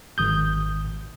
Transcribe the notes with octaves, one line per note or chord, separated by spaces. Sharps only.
G#1 D#6 G6